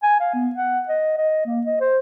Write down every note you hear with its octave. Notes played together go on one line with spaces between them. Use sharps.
G#5
F5
B3
F#5
D#5
D#5
A#3
D#5
C5